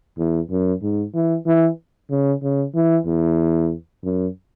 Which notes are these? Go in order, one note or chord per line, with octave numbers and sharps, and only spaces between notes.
E2
F#2
G#2
E3
E3
C#3
C#3
E3
E2
F#2